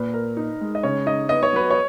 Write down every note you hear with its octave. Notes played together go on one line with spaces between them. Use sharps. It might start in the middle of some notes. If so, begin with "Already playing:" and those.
Already playing: A#2 B4
A#4
D#4
G#3
D#5
C#3 C#5
D#4 D#5
B3 D#5
C#5
F#3 B4
C#5